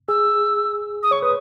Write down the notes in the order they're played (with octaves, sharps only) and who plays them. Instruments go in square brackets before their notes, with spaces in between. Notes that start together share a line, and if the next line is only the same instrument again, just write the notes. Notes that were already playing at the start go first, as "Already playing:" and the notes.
[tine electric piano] G#4 [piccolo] E6
[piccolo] D#6
[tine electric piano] C#5 [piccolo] C#6
[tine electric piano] B4 [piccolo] D#6